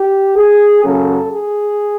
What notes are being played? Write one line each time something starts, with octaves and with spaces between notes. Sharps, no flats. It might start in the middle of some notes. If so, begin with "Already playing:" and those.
Already playing: G4
G#4
F#2 C#3 F#3 A#3 C#4 A4
G#4